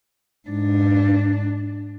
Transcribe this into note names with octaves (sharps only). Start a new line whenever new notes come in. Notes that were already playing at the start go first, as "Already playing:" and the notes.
G#2 D4